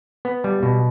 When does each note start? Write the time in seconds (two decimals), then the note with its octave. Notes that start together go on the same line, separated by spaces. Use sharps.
0.25 B3
0.44 G3
0.63 B2